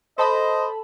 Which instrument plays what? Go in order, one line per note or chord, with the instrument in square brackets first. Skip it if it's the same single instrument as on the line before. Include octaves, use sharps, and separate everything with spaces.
[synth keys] A4 A5 B5 [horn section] C5 D#5